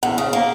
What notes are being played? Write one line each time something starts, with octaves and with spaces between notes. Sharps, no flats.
E2 F#5
C#3
A#3 A#5